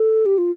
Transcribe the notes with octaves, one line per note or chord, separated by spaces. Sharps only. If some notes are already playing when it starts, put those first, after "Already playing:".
Already playing: A4
G4
F4